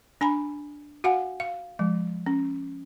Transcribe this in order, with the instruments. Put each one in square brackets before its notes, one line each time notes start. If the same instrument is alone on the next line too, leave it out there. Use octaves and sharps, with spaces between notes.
[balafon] D4 G#5 A#5 B5
F#4 F5 F#5 G#5
F5
F3 G#3
C#4